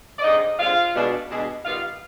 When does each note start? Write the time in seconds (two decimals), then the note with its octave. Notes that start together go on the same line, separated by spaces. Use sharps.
0.18 D5
0.23 D3 G#3 C4 D#4 D#5
0.58 D3 G#3 C4 F4 F5
0.94 B2 G#3 D4
1.30 B2 G#3 D4
1.64 D#3 G3 B3 F4 F5